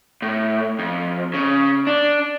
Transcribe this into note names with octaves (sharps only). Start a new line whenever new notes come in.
A2
F2
C#3
D4